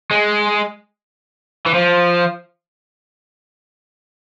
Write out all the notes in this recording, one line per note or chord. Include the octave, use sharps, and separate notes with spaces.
G#3
E3
F3